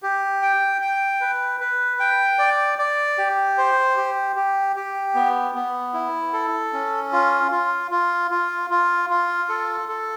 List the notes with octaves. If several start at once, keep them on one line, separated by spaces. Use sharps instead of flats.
G4
G5
G5
B4
B4
G5
D5
D5
G4
C5
G4
G4
G4
B3
B3
E4
A4
C#4
F4
F4
F4
F4
F4
F4
A4
A4